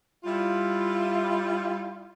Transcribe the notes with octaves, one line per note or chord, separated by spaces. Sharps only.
G3 E4 F4